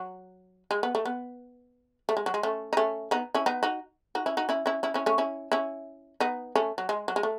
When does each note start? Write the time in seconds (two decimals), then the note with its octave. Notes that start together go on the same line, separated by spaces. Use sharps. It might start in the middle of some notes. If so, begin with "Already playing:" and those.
Already playing: F#3
0.71 G#3
0.83 B3
0.95 A3
1.05 B3
2.09 A3
2.17 G#3
2.26 F#3
2.34 G#3
2.43 A3 C#4
2.73 D#4
2.77 A3 C#4
3.11 B3 D#4
3.35 C#4 E4
3.46 B3 D#4
3.63 D#4 F#4
4.15 D#4 F#4
4.26 C#4 E4
4.37 D#4 F#4
4.49 C#4 E4
4.66 C#4 E4
4.83 C#4 E4
4.94 C#4 E4
5.06 A3 C#4
5.18 C#4 E4
5.52 C#4 E4
6.20 B3 D#4
6.55 A3 C#4
6.78 F#3
6.89 G#3
7.08 F#3
7.16 G#3
7.23 A3